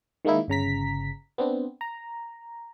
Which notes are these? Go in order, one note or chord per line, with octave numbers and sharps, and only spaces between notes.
D#3 G#3 A#3 D#4 E4
G1 C#3 A#5 B6
B3 C4 D4
A#5